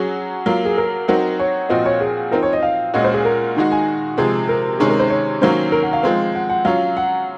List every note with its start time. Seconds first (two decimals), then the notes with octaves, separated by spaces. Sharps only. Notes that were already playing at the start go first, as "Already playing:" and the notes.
Already playing: F#3 C#4 F#4 G#4
0.46 F#3 A#3 F4 A#4
0.65 G#4
0.78 A#4
1.08 F#3 C4 D#4 F#4 A#4
1.40 C#5
1.69 A#2 F3 C4 F#4 D#5
1.86 C#5
2.01 G#4
2.31 F3 C4 D#4 A#4
2.43 C#5
2.53 D#5
2.63 F5
2.94 A#2 G#3 C#4 F#4 D#5
3.04 C5
3.14 G#4
3.25 A#4
3.56 D#3 G#3 D#4 F#4
3.72 G#5
4.17 C3 F3 G#3 G#4
4.49 A#4
4.79 C3 D#3 G#3 C#4 G#4
4.90 A#4
5.00 C5
5.10 C#5
5.41 D#3 F#3 A#3 C#4 C5
5.72 A#4
5.83 F#5
5.93 F5
6.03 F3 G#3 C4
6.35 F#5
6.49 F#5
6.65 F#3 C#4 F4 F5
6.97 F#5